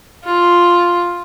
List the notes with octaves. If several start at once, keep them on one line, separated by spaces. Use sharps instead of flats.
F4